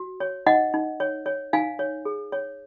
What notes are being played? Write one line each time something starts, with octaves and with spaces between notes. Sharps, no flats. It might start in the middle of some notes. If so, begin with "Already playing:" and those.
Already playing: F#4
C#5
D#4 D#5 F#5
D#4
C#5
C#5
D#4 F5 G#5
C#5
G#4
C#5